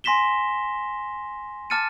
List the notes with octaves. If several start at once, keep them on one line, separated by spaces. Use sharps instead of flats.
G#5 C6 A#6 B6 E7 G7
A5 D6 F6 A6 C#7 D#7